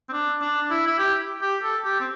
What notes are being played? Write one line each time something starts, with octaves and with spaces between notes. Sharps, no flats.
C4
D4
D4
E4
E4
G4
G4
A4
G4
C4